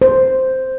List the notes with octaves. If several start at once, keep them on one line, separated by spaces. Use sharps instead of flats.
C5